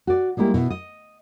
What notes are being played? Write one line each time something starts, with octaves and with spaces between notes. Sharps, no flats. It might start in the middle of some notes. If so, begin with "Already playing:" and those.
F#4 D5
G3 G#3 A#3 E4 G4
B2 E4
D#5